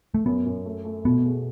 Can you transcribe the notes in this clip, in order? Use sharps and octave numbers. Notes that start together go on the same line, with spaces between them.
A3
F#2 B3
F#2
A3
A3
B2 B3
G#4